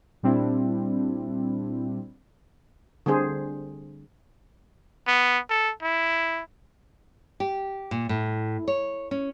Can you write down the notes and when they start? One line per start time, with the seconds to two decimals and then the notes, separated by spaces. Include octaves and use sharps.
0.23 A#2 G3 C4 D4 E4
3.06 D3 G3 C4 G#4 C5
5.08 B3
5.50 A4
5.83 E4
7.40 G4
7.91 A#2
8.09 A2
8.68 C#5
9.11 C#4